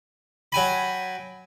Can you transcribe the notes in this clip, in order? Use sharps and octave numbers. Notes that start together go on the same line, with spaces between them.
F#3 G5 G#5 B5